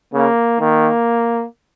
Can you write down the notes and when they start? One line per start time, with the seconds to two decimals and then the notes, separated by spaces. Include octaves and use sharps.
0.13 C#3 A#3
0.60 D#3 A#3